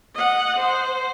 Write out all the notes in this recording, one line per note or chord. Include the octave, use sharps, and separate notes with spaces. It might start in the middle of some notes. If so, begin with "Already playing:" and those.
D#5 F#5
C5